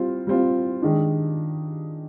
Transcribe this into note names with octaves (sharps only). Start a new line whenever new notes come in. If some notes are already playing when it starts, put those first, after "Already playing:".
Already playing: G3 C4 F4
G3 C4 F4
D#3 G#3 D4